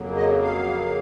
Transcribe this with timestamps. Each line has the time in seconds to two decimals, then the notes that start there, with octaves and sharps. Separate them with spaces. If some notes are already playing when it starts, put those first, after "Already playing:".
Already playing: F2 C#3 F#3 A#3
0.17 D#5
0.42 F5